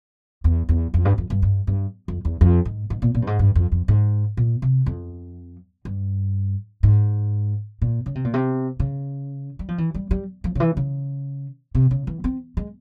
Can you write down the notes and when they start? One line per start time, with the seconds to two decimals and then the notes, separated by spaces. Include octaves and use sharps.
0.44 E2
0.69 E2
0.94 F2
1.05 G2
1.18 F2
1.30 G2
1.42 G2
1.67 G2
2.08 F2
2.25 E2
2.41 F2
2.65 G#2
2.90 G#2
3.02 A#2
3.15 A#2
3.22 G2
3.27 G#2
3.39 G2
3.55 F2
3.72 F2
3.88 G#2
4.37 A#2
4.62 C3
4.86 F2
5.85 G2
6.83 G#2
7.82 A#2
8.06 C#3
8.15 C3
8.25 A#2
8.34 C3
8.80 C#3
9.59 G3
9.69 F3
9.78 E3
9.94 G3
10.11 G3
10.44 F3
10.55 C#3
10.60 E3
10.77 C#3
11.75 C3
11.91 C#3
12.07 E3
12.24 C4
12.57 G#3